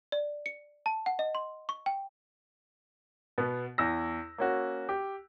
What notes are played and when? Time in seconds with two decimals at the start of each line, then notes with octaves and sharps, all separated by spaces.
0.12 D5
0.46 C#7
0.86 A5
1.06 F#5
1.19 D#5
1.35 C6
1.69 C#6
1.86 G5
3.38 B2 B3
3.78 E2 E6 A#6
4.38 A#3 C#4 F#4
4.89 G4